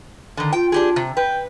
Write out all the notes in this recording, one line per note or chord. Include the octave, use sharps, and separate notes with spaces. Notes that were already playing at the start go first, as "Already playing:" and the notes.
D3 D#3
F4 G5
D4 G4 G#4
C3
B4 G5